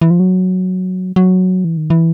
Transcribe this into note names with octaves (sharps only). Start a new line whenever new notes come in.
E3
F3
F#3
F#3
E3
D#3
E3